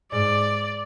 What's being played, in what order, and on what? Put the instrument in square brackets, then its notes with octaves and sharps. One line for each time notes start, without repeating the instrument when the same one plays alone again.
[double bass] G#2 [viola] D5